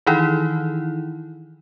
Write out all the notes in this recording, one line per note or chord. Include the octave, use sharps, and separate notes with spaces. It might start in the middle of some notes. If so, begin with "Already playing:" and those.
D#3 E3 D#4 E4